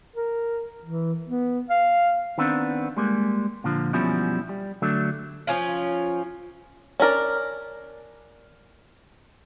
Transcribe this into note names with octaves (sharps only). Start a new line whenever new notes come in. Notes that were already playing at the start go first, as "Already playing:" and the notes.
A#4
E3
B3
F5
D#3 B3 C4 D4
G3 G#3 A#3
A#2 D3 F3
F#2 B2 F3 G3 C#4 E4
G3
D3 F#3 A3 D4
F3 C#4 F4
C#4 D4 A#4 D5